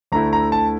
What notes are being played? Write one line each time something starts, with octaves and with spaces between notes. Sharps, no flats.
D2 D3 A3 E4 A#5
A#5
A5